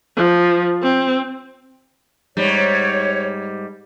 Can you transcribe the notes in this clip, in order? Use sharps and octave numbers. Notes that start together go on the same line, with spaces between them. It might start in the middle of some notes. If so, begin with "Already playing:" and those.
F3
C4
G#2 G3 C#5